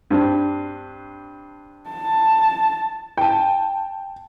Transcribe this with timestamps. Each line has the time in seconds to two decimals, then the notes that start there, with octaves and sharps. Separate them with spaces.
0.11 G2 C4 D4
1.90 A5
3.17 G5 A5